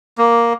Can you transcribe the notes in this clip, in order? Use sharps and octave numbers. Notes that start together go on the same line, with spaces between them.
A#3